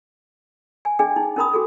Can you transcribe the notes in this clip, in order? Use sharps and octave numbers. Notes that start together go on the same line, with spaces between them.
G#5
D4 G#4 D#5 G5 G#5
D#4
C#4 D#4 A#4 A#5 B5 D#6
F#4 G#4 A4